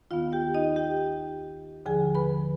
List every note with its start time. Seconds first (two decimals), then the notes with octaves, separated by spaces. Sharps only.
0.11 D#2 D#3 B3 F4 F5
0.32 G4 G5
0.54 D#4 D#5
0.76 G4 G5
1.85 D#2 D3 F3 G#4 G#5
2.15 B4 B5